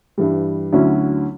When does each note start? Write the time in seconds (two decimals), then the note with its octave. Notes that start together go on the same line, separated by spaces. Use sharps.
0.18 G2 E3 G3
0.72 D2 D3 F#3 C#4 E4